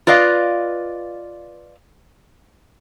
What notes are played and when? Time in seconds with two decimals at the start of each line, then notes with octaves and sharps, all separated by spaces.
0.07 F4 B4 D5 D#5 F5